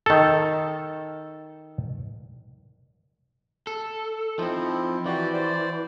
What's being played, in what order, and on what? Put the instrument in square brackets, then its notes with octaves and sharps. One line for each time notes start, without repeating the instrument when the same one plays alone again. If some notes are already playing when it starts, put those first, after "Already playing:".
[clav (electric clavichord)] D#3 A4
[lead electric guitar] A4
[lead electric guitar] F3 C4 [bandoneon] D#4 E4
[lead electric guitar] E3 [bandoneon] F#4 G4 D5
[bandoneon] C5 D5